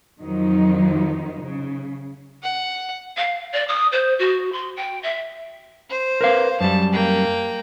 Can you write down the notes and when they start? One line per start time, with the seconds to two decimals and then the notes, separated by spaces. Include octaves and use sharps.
0.21 F2 D#3 F3 F#3 D#4
1.44 C#3
2.43 F#5
3.17 F5
3.53 D5
3.68 D#6
3.92 C5
4.19 F#4
4.53 C6
4.77 G5
5.03 E5
5.90 C5
6.21 A#4 B4 F5
6.61 F#2 G3 A5
6.93 A#3 G5